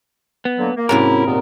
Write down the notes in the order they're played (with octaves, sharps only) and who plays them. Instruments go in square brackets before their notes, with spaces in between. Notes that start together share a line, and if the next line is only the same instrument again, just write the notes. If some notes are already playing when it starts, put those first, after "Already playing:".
[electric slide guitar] B3
[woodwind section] D3 F#3 A#3
A#3
[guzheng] G#2 C3 A#3 [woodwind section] F#3 C#4 E4 [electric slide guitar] A#4
[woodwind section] D#2 A#2 B3